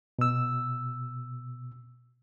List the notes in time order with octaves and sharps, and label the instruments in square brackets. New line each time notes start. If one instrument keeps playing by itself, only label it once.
[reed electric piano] B2 E6